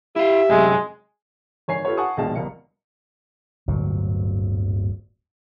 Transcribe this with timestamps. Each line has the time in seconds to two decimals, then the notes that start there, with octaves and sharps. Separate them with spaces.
0.16 E4 G4 E5 F5
0.49 F#2 C3 F#3 G#3
1.68 G#1 C#5 G#5 C7
1.85 F4 G4 A4 B4 C#5
1.97 F#5 G#5 A5 C#6 D#6
2.17 A#1 D#2 B2 G#3 F5 A5
2.35 F#1 C2 B2 F5 C#7
3.68 D1 G1 A#2 F#3